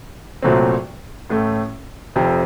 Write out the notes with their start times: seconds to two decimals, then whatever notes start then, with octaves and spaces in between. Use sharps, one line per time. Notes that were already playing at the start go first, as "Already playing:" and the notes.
0.42 C2 A#2 F#3 A3 C4
1.29 A1 A2 A3
2.16 F1 F2 C3 F3